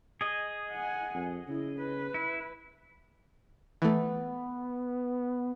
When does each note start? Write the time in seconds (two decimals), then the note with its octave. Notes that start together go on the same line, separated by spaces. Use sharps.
0.21 G#4 D#5
0.71 F#5 G#5
1.14 F2
1.48 C#3 E4
1.79 B4
2.14 E4
3.82 E3 A3 B3